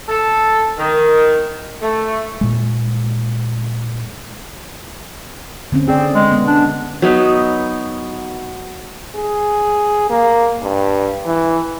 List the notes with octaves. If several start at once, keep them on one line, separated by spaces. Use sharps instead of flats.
A4
D#3
A3
A#2 G#3
D3 C4 C#4
C4 G#4 D5
G#3
B3
D4
F#3 B3 D#4 B4
G#4
A#3
G2
E3